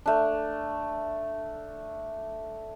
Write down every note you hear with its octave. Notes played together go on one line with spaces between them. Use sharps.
A3 D4